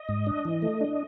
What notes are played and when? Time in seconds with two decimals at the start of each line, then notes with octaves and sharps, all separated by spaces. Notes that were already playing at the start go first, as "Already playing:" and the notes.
Already playing: D#5
0.09 G#2
0.27 D4
0.45 E3
0.62 A3
0.81 D4